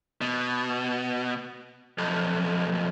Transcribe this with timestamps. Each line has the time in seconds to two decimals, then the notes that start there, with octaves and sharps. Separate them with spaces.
0.21 B2
1.98 B1 F2